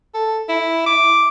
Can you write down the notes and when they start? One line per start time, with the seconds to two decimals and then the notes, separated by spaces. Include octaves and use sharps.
0.14 A4
0.49 E4
0.86 D6